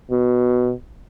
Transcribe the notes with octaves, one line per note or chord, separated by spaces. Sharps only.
B2